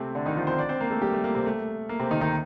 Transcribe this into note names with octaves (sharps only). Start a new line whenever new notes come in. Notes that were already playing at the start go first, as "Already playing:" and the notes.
Already playing: C3 A3 C4
D3 D4
D#3 D#4
F3 F4
C4 C5
D4 D5
C4 C5
A#3 A#4
A3 A4
G3 G4
A3
A#3
C3 C4
A3
A#3
C3 C4
D#3 D#4
D#3 D#4